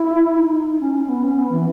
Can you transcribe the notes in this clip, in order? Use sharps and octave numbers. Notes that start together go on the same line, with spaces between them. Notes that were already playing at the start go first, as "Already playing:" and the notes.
Already playing: E4
D#4
C#4
C#4
B3
C#4
B3
E3